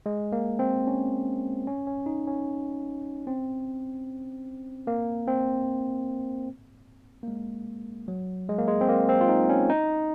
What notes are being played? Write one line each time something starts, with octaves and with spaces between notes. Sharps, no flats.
G#3
A#3
C4
C#4
C#4
C#4
D#4
C#4
C4
A#3
C4
A#3
G#3
F#3
G#3
A#3
G#3
C4
A#3
C4
F4
D#4
C#4
D#4